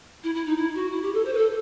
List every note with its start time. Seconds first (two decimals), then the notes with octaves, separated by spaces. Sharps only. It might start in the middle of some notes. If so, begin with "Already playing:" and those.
0.24 E4
0.35 E4
0.46 D#4
0.57 E4
0.75 F#4
0.91 E4
1.02 G4
1.14 A4
1.25 C5
1.34 B4
1.38 A4